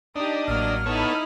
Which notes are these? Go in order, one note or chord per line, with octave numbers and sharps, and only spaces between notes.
D4 D#4 G4 D#5
A1 F#3 A#3 F6
B3 D#4 E4 A4 C#5